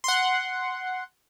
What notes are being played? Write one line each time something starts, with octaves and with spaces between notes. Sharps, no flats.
F#5 C6